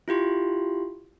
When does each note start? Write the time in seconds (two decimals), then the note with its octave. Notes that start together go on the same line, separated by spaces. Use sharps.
0.08 E4 F4 G4 C6